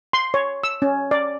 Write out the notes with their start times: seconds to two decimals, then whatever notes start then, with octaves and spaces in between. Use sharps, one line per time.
0.13 C6
0.34 C#5
0.64 E6
0.82 C#4
1.11 D5